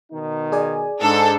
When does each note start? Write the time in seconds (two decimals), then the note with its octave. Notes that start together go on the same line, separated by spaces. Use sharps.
0.12 B2 D#3 D#4
0.52 G#4 D5 G#5
1.02 G#2 D4 A4